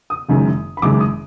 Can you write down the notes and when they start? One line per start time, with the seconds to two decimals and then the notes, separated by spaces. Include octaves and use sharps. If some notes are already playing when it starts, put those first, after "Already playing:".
0.10 D#6
0.29 F#1 F#2 D#3 G#3
0.77 B5
0.82 F#1 F#2 D#3 G#3 D6
1.00 D#6